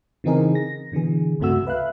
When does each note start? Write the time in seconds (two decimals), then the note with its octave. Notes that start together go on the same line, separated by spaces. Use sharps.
0.24 C#3 E3 C4 D#4 G#4 A#4
0.55 A#6
0.92 B2 D3 E3 G#4
1.40 C#2 G2 C3 A3 F#4 E6
1.67 B4 E5 F5 F#6